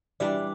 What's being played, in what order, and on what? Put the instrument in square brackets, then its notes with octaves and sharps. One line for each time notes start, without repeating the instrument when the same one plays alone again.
[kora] E3 G3 D4 [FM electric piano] D5